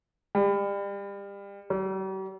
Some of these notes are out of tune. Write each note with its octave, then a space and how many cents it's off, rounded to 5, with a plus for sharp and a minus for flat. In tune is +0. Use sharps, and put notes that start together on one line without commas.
G3 +30
G3 -45